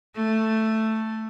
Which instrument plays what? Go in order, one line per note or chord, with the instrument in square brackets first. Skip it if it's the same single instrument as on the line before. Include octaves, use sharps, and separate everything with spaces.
[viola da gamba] A3